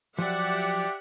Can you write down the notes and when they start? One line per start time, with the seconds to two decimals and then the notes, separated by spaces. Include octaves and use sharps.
0.18 F3 F#3 G4 D5 E5 F#5